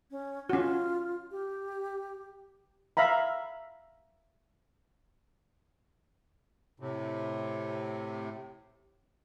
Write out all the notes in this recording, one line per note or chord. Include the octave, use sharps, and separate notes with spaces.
C#4
C#4 F4 F#4
G4
E5 F5 A#5 B5
A2 C3